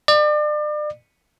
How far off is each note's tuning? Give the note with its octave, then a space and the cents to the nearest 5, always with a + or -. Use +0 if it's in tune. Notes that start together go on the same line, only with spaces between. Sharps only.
D5 +35